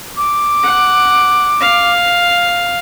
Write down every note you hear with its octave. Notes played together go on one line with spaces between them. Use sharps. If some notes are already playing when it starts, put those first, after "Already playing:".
D6
F#5
F5